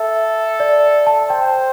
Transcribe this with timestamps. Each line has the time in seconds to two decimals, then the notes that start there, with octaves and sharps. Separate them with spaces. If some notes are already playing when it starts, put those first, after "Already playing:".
Already playing: A4 E5
0.60 D5
1.07 A5
1.30 C5 G5